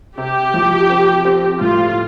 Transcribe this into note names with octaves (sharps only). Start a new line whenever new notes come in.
C3 G4
F3
C4
C4
A2 F4